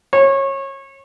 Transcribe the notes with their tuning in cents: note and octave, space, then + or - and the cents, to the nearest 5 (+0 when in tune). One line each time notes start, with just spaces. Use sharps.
C#5 -25